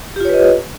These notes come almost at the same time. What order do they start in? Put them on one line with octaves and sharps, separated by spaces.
G4 F4 C#5 B4 D#5